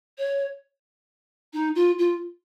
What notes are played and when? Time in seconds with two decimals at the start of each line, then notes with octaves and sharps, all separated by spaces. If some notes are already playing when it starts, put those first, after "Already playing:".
0.18 C#5
1.53 D#4
1.75 F4
1.99 F4